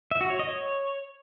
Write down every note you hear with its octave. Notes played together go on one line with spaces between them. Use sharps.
E5
F#4
C#5
D#5
C#5